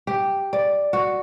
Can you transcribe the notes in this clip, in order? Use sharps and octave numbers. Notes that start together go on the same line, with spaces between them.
G4
D5
F#4